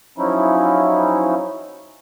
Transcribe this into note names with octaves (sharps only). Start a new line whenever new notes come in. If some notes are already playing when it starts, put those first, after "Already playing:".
F3 F#3 C#4 D#4 E4